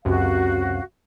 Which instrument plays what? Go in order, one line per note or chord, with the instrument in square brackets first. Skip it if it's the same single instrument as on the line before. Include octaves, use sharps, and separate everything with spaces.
[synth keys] C#2 F#2 C3 [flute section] F#4 F5